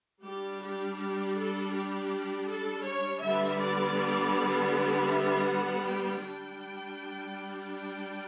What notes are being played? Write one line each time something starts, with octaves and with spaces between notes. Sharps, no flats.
G3 D4 G4
G4
G4
A4
G4
A4
C#5
D3 G3 B3 E5
D5
E5
F#5
G5
G3 D4 G5
G5